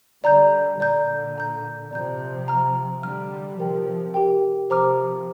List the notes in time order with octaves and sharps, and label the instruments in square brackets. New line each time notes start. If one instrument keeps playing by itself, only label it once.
[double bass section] D3 G3 [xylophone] D5 A#5 G6
[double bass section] A#2 D3 [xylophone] D5 A#5 G6
[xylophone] D5 A#5 G6
[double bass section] C3 F3 [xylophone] D5 A#5 G6
[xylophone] F5 A#5 F6
[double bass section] D3 G3 [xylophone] F5 A#5 F6
[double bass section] C3 F3 [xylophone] G4 A#4 G5
[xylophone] G4 A#4 G5
[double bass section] C3 F3 [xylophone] G4 C5 A#5 D6 F6